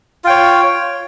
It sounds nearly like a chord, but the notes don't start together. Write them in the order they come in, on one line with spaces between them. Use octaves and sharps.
F4 G5 C#5